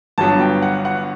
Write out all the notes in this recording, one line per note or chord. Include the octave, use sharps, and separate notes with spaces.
G1 G2 F#3 B3 A5
G5
F#5
F#5